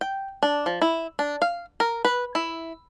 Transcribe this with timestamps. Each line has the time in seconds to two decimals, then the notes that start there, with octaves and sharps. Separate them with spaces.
0.01 G5
0.43 D4
0.66 F3
0.82 E4
1.19 D4
1.42 F5
1.80 A#4
2.05 B4
2.35 E4